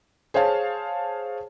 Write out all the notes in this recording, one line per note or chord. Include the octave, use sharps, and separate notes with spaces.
G#4 C5 C#5 F5 A5